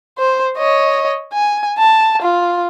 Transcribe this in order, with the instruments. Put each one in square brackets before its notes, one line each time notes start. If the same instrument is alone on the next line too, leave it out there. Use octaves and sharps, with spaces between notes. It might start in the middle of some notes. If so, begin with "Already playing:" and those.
[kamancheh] C5
C#5 D#5
G#5
A5
F4